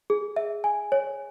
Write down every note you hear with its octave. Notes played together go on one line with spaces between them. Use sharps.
G#4
E5
G#5
C#5